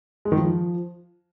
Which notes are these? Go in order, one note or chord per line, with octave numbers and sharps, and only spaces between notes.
G#3
D#3
F3